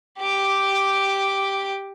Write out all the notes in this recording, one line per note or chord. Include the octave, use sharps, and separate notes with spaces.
G4 D6